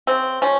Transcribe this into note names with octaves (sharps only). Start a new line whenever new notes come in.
C#3 C4
F3 G#3 C#4